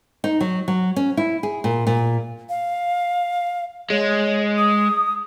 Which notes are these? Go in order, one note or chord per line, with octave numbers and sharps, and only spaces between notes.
D#4
F#3
F#3
C#4
E4
G#4
A#2
A#2
F5
G#3 C#5
D#6